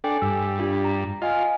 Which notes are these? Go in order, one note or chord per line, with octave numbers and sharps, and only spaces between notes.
D4 A4 G5 G#5
G2 E6
D4 F4 G4
A#5
F4 D#5 F5 G#5